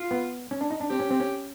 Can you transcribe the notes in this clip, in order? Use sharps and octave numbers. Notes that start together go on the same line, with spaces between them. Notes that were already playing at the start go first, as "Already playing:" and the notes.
Already playing: F4
B3
C#4
D4
D#4
D4
C4 G4
C#4
C4
C#4